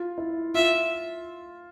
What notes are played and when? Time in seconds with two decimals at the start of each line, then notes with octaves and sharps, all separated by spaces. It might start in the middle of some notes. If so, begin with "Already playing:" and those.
Already playing: F4
0.18 E4
0.54 F4 E5